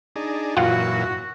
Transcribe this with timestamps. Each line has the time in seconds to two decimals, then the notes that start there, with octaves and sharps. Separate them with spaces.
0.16 D4 D#4 G#4
0.57 F#2 A#2 E3 F4 F#4 F#5